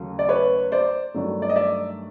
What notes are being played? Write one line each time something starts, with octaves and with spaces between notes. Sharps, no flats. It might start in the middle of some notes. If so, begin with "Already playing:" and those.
Already playing: D#2 C#3 F#3 A3
D5
B4 C#5
C5 D5
G2 D#3 F#3 A3
D5
D#5
D5 E5